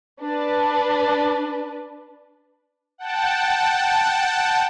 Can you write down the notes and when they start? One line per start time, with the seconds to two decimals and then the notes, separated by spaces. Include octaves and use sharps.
0.20 D4 B4
2.98 F#5 G5 A5